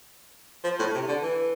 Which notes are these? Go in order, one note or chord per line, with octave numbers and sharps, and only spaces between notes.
F3
A2
C3
D3
E3